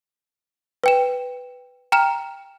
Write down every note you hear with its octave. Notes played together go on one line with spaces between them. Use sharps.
B4 G5 E7
G5 A#5 F6 E7